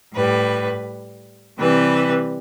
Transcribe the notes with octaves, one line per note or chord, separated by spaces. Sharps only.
A2 G3 B4
C3 E3 G3 B4